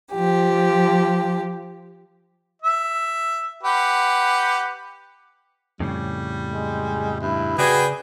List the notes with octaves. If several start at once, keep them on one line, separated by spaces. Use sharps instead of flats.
F3 G4
E5
G4 B4 F#5
F2 A2 C#3 G3
G#3
G2 E4
C#3 F#4 G#4 B4 D5 G5 G#5